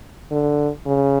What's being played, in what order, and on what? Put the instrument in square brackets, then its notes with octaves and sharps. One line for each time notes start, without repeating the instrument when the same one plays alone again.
[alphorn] D3
C#3